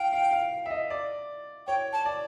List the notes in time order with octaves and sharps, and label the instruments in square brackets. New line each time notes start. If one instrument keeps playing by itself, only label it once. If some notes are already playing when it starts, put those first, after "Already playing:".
Already playing: [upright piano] F5 [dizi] G5
[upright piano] F5
F5
E5
D#5
D5
[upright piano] C#5 [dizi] G5
[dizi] A5
[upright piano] D5